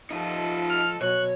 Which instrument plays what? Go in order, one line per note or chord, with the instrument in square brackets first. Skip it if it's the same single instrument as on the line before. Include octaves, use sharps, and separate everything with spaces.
[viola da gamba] F3 A4 D#5 [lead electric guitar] D#4 F4
[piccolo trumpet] F6
[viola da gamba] B2 F#3 [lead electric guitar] C#5 [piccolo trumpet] F#6